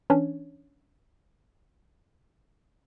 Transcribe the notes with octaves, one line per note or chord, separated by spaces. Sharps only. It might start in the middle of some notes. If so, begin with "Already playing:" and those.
E3 C#4 D4 C#5